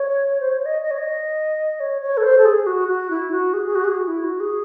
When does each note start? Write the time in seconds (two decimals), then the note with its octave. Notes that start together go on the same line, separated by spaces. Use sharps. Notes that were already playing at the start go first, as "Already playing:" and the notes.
Already playing: C#5
0.40 C5
0.50 C#5
0.66 D#5
0.82 D#5
0.91 C#5
0.98 D#5
1.80 C#5
2.02 C#5
2.17 A4
2.23 C5
2.38 A4
2.45 G#4
2.67 F#4
2.88 F#4
3.10 E4
3.32 F#4
3.54 G#4
3.66 G#4
3.75 F#4
3.84 G#4
3.91 F#4
4.07 E4
4.24 F#4
4.40 G#4